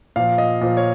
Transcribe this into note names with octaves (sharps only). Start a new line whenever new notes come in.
A#2 F3 F5
D#5
A#2 F3
C#5